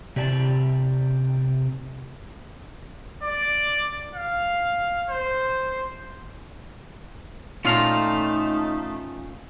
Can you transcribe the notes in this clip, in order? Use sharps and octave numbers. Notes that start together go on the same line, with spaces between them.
C3 G4 D5 G#5 A5
D5
F5
C5
A#2 A3 C#4 D#4 F4 F5 A#5